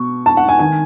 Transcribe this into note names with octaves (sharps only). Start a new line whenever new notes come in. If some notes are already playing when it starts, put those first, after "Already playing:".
Already playing: B2 C#6
A5
F#5
G#5
D#3 G#5